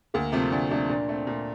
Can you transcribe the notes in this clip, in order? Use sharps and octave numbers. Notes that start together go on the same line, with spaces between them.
D2 A#3
C3 F3 A3 C4
D2 D4
C3 F3 A3 D4
A#2 D4
A3 C4
A#2